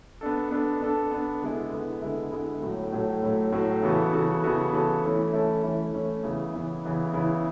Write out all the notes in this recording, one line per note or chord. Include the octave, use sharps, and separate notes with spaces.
B3 D4 A4
B3 D4 A4
B3 D4 A4
B3 D4 A4
D3 G#3 B3 E4
D3 G#3 B3 E4
D3 G#3 B3 E4
D3 G#3 B3 E4
A2 F#3 A3
A2 F#3 A3
A2 F#3 A3
A2 F#3 A3
C#3 E3 B3 F#4 A4
C#3 E3 B3 F#4 A4
C#3 E3 B3 F#4 A4
C#3 E3 B3 F#4 A4
E3 A3 C#4 E4 A4
E3 A3 C#4 E4 A4
E3 A3 C#4 E4 A4
E3 A3 C#4 E4 A4
C#3 E3 B3 E4
C#3 E3 B3 E4
C#3 E3 B3 E4
C#3 E3 B3 E4